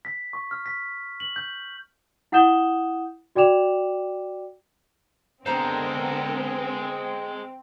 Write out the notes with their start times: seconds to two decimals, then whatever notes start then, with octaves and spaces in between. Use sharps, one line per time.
0.05 B6
0.33 C#6
0.51 F6
0.66 B6
1.20 F#7
1.36 G6
2.32 E4 F#5 D#6 G6 E7 G7
3.36 F#4 D5 G5 D6 E7 F7
5.46 D3 G#3 B3 C4 A4 A#4 C5 A#5